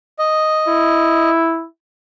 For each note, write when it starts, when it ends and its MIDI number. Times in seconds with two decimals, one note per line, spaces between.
0.19 1.30 75
0.68 1.66 64